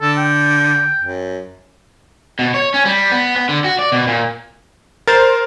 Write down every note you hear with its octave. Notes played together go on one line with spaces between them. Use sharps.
D3 A4
G5
F#2
B2
C#5
C#4
G3
B3
B3
D3
F#4
D5
B2
A#2
A#4 C5 A6